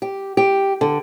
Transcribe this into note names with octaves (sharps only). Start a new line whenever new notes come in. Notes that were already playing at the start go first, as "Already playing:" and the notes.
G4
G4
D3